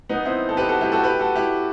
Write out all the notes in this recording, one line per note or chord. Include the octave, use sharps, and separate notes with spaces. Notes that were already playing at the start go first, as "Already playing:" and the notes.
B3 D#4
C4 E4
A4
G4 B4
F#4 A4
E4 G4
F#4 A4
G4 B4
F#4 A4
E4 G4